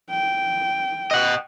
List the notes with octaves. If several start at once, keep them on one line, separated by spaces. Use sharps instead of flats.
G5
D#5 F#5